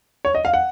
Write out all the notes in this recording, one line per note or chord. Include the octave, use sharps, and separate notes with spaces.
C#5
D#5
F5
F#5